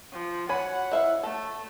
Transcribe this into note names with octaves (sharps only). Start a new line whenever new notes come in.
F3
F#4 C#5 F#5 G#5 B5
E4 E5 F5
A3 A4